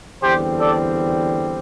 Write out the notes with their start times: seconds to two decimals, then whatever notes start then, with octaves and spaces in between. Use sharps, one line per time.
0.22 E2 D3 G3 C4 G4 C5
0.60 A4 D5